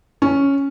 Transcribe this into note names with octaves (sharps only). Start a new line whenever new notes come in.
C#4